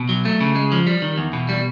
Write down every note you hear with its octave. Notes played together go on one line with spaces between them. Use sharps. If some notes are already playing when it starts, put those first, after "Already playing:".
Already playing: B2
F#3
A3
C#3
G#3
F3
G3
D#3
E2
B2
G3